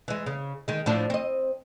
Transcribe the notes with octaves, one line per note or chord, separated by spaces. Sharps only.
E3 G#3
C#3
D#3 G#3
A2 F3 D4
C4 D#5